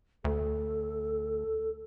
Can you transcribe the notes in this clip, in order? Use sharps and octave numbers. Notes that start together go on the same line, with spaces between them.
D2 A4